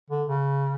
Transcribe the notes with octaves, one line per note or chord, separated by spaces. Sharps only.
D3
C#3